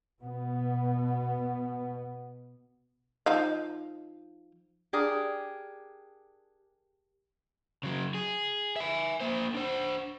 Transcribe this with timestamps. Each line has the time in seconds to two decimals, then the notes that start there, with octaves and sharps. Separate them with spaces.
0.22 B2 B3
3.26 F3 D#4 F5
4.93 D4 G4 G#4 A#4
7.83 C#3 F#3
8.15 G#4
8.76 E5 G#5
9.21 A#3 C5
9.54 D4 C5